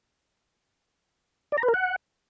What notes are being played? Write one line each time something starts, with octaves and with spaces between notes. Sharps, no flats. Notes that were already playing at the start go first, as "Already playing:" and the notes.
D5
A#5
B4
A#4
F#5